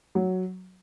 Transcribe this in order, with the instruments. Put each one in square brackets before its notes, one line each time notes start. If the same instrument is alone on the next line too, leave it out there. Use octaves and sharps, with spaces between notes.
[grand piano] F#3